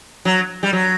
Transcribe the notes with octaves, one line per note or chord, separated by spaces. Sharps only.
F#3
G3
F#3